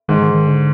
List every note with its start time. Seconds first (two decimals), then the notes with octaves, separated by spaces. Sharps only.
0.08 G#2 D#3
0.22 D#3
0.34 D#3
0.47 D3